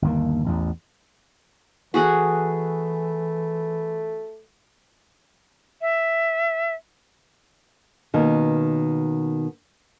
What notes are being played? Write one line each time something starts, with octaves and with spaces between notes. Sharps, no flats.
G1 D#2 A#3
A1 E2
E3 A3 F#4 G#4 F#5
E5
B2 D#3 A#3 C#4